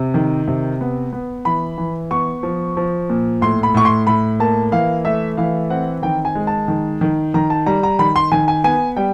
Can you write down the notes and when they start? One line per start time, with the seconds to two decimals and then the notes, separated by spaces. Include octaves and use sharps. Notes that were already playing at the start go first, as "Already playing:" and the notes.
Already playing: C3
0.14 D#3
0.48 C3
0.81 B3
1.13 B3
1.45 E3 B5
1.78 E3
2.11 B3 C#6
2.43 F3
2.77 F3
3.09 A#2
3.42 A2 C6
3.63 B5
3.74 A2 C#6
3.85 C6
4.07 A2 B5
4.40 A#3 A5
4.72 E3 F5
5.05 A3 E5
5.37 E3 F5
5.70 C4 F#5
6.02 D#3 G5
6.25 G#5
6.35 G#3
6.47 A5
6.68 D#3
7.01 D#3
7.34 D#3 A#5
7.50 A5
7.66 G3 A#5
7.83 A#5
7.99 D#3 B5
8.16 C6
8.32 D#3 G#5
8.48 G#5
8.64 B3 G#5
8.96 G3 G5